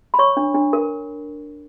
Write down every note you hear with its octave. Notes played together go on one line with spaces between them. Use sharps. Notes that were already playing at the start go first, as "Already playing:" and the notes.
B5
C#5 C#6
D4
D4
A#4